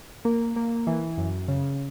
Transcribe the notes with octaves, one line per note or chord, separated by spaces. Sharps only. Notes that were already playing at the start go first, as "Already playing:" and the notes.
A#3
A#3
E3
F#2
C#3